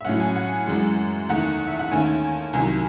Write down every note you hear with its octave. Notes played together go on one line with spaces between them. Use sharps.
E5
A2 F#3 C#4 F#5
G#5
F#5
F#2 E3 G#3
E2 D#3 A3 F#5
E5
F#5
D#2 D#3 A3 C#4 G#5
C2 C3 D#3 F#3 G#5